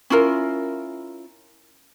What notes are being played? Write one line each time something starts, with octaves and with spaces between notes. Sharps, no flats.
C#4 E4 F4 A#4